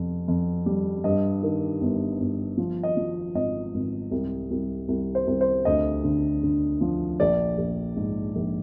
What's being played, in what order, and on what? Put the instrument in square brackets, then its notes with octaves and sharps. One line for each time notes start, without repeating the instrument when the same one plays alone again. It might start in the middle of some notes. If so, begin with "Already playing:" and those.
Already playing: [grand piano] F2 C3
F2
G3
G2 D#5
D#3
G1
G1
F3
D#5
F3
G#1 D#5
G#1
C2
C2
C2
C5
C2
C5
D2 D#5
D3
D3
F3
A#1 D5
A#1
G#2
A#1